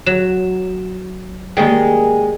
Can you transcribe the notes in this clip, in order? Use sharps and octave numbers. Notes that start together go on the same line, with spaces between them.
F#3 E7
D#3 G3 G#3 A#3 C#4 G#4 D#5 G5